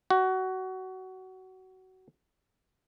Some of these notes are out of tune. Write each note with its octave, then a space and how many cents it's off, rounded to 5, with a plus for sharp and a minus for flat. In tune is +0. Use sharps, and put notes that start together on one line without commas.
F#4 +20